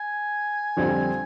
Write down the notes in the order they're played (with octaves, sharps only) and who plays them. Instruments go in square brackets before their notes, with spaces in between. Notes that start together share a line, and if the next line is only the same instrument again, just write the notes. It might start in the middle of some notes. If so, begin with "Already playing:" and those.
Already playing: [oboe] G#5
[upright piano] F2 D3 G3 C4 F4